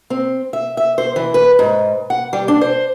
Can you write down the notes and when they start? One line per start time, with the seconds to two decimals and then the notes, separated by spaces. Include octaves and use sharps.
0.10 C4
0.53 E5
0.77 E5
0.98 C5
1.16 E3
1.34 B4
1.59 G#2
2.10 F#5
2.33 G3
2.48 D4
2.61 C5